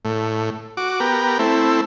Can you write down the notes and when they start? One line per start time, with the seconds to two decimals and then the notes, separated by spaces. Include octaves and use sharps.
0.05 A2
0.77 F#4 D6
1.00 B3 G4 A#4
1.39 A3 C4 E4